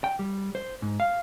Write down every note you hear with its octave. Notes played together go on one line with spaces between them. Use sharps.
G5
G3
C5
G#2
F5